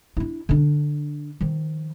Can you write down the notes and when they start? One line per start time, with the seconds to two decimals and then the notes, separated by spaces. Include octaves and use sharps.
0.17 D4 E4
0.49 D3 D4
1.41 D#3 F3